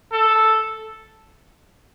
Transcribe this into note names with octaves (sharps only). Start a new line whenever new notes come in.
A4